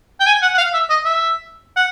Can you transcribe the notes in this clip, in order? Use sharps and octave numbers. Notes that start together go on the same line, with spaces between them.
G5
G#5
F#5
F#5
F5
E5
D#5
E5
F#5